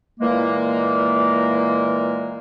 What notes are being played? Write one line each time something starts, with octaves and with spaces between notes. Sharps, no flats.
A#2 E3 G#3 A#3